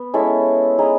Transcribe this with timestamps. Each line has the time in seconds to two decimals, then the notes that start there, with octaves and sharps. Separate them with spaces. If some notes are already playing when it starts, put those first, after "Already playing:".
Already playing: B3
0.14 G#3 C#4 E4 A4
0.78 D#4 G#4 B4